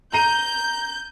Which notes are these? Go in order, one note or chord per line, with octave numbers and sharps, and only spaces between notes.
A#5 G6 D#7